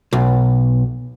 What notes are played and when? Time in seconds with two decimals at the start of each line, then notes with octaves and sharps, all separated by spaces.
0.13 B1